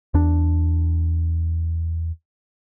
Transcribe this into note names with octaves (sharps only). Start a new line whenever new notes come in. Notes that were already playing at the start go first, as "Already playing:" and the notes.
E2 D4